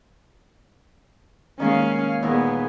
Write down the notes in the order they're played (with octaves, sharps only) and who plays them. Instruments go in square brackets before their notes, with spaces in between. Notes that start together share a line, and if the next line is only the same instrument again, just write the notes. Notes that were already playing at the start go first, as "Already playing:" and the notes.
[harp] D#3 G#3 A#3 [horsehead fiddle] C#4 F5
[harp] D#2 A#2 A#4 [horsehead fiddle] B3 G#4